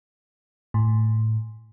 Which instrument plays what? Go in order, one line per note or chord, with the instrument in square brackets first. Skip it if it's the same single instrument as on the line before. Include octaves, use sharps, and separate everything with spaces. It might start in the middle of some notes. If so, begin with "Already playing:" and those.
[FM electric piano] A2